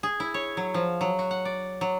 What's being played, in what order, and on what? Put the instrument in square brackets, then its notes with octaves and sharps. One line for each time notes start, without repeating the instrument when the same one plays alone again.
[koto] G#4
E4
C#5
F#3
F3
F#3
F#4
F#5
D5
F#3